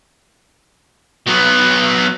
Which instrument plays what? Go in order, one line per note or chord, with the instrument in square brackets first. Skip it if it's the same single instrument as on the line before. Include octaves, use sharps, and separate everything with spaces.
[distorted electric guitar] F#3 B3